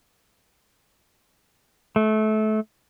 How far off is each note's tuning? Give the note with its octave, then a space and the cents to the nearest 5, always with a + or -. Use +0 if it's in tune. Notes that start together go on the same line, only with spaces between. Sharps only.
A3 -25